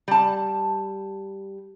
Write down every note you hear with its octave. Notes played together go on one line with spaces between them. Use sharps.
G3 A5